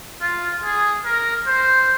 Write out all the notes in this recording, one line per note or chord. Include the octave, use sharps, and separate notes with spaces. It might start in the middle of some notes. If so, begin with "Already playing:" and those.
F4
G#4
A#4
C5